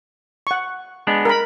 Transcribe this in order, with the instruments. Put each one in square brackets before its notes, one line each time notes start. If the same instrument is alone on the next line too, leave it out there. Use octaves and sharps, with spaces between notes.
[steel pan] F#5 C#6
[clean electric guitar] G#3 B3 D4
[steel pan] A#4 B5